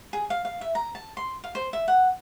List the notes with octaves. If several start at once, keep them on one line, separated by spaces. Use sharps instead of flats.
G#4
F5
F5
E5
A#5
A5
C6
F5
C5
E5
F#5